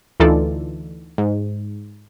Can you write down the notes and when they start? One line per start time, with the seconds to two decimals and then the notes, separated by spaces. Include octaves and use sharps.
0.20 D2 E3 D#4 F4 A4 D5
1.18 G#2